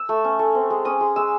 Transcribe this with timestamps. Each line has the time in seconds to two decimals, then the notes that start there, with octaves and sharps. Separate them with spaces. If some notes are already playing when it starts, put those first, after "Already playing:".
Already playing: E6
0.09 A3
0.24 C#4
0.39 A3
0.55 C4
0.70 G#3
0.85 C#4 D#6
1.01 G#3
1.16 G#3 E6